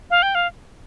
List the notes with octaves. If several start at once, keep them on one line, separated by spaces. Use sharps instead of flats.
F5
G5
F5